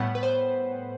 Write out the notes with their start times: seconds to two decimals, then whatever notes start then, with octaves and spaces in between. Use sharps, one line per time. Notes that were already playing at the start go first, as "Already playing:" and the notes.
Already playing: A2 G3 B3 F#5
0.15 B4
0.23 C5